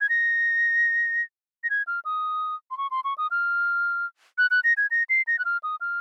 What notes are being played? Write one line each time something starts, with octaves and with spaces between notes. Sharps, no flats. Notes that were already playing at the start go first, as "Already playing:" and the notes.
G#6
A#6
A#6
G#6
F6
D#6
C6
C#6
C6
C#6
D#6
F6
F#6
F#6
A#6
G#6
A#6
C7
A#6
F#6
F6
D#6
F6